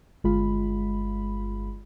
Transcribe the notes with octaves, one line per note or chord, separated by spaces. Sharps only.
G1 G#3 F4 B5